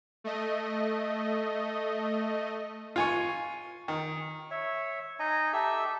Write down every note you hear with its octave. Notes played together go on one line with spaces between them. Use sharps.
A3 D#5
F4 G#5 C#6
D#3
C#5 E5
D#4 D#5 G#5 A#5
G4 A4 E5 E6